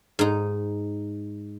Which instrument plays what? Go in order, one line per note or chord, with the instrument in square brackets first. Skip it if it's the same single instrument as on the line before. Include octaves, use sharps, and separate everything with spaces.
[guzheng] G#2 D#4